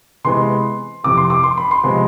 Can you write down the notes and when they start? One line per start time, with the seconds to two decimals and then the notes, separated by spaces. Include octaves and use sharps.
0.24 C3 E3 G#3 B3 C6
1.04 F2 C3 E3 D6
1.17 C6
1.30 D6
1.43 C6
1.58 B5
1.71 C6
1.83 C3 F3 G#3 B3